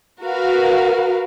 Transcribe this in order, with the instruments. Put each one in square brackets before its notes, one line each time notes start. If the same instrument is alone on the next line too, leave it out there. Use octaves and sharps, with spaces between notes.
[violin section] F#4 A#4 B4 F5